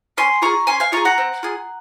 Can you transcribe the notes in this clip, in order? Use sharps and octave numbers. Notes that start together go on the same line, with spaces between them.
C#4 G#5 C6
F4 G#4 A#5 C#6
C#4 G#5 C6
F5 G#5
F4 G#4 A#5 C#6
F#5 A#5
C4
F4 G#4